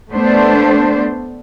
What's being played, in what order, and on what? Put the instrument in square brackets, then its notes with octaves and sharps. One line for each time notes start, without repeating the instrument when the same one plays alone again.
[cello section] A3 B3 D4 C5